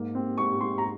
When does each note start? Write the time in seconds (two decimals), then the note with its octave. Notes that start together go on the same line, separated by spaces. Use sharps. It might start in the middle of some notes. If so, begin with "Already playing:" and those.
Already playing: G#2 A#3
0.15 C4
0.38 G#2 C#6
0.61 G#2 C6
0.78 A#5